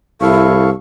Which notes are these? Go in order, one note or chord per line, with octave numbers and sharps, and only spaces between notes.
C2 E4 A4 F5 C#6